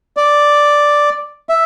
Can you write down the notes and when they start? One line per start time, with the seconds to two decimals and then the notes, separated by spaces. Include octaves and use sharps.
0.17 D5
1.49 E5